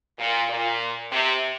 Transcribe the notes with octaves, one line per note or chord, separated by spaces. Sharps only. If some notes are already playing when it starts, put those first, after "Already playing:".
A#2
A#2
C3